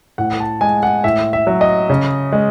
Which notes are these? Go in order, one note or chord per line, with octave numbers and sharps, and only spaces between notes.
A2 F#5
A5
G#3 G#5
F#5
A2 E5
E5
F#3
D#5
C#3
G#3